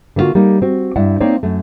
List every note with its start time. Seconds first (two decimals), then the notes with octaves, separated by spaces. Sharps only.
0.16 D3 A#3 B3 F4 F#4
0.35 G3 A#3 D#4
0.62 C4 F#4
0.96 G2 E4 D5 F#5
1.21 A#3 C4 D#4 C#5 D5
1.43 F#2 A3